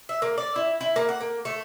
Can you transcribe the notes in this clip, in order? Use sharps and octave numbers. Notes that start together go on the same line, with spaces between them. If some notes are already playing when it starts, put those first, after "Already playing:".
E5
A#3
D5
E4
E4
A#3
F#5
A#3
A3